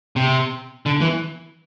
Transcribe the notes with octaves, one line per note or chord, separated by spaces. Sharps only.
C3
D3
E3